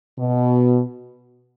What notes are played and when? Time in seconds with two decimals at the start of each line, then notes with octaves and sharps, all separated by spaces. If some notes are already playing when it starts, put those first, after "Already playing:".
0.18 B2